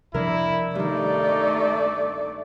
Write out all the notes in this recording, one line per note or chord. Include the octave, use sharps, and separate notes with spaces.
C3 F3 G3 D4 E4 A#4
G2 D#3 A3 D#4 D5